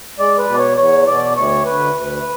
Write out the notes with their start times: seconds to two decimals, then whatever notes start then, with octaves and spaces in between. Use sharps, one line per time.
0.19 G#3 D5
0.38 B4
0.48 B2
0.54 D5
0.58 C#5
0.77 E2 C#5
1.07 B2 D5
1.36 D2 C#5
1.65 D2 B4
1.95 D2